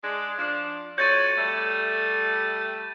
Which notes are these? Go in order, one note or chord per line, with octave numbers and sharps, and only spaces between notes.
G#3 D4
F3 D4
F2 F#4 C#5 G6 A6 D#7
G3 A3